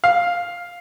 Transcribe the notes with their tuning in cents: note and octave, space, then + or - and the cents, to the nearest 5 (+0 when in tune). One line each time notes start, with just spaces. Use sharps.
F5 +5